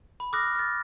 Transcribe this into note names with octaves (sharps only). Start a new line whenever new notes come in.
B5
D6 D#6 F6 F#6 A#6
F6 A6